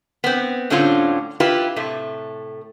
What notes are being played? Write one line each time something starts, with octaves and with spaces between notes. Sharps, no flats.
B3 C4
A2 D3 G3 C4 C#4 F4
E4 F4 G4 B4
A2 C3 A3